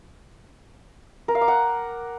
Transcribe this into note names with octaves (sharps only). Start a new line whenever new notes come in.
A#4
F5
D6
F#5